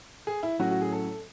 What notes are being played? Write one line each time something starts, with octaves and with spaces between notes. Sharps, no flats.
G#4
E4
A2 F#3 C#4 F#4
F#4
G#4
A4